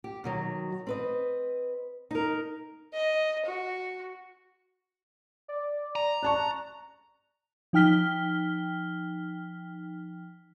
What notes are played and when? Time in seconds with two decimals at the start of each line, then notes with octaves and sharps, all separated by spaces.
0.04 G4
0.24 B2 D#3 F#3
0.87 C4 B4 D#5
2.11 D#4 A#4
2.94 D#5
3.46 F#4
5.48 D5
5.96 A#5
6.23 D5 A5 C#6 F#6
7.73 F3 D#4 G5 F6 B6 G7